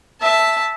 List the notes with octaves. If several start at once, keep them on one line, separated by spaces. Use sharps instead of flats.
E5 A5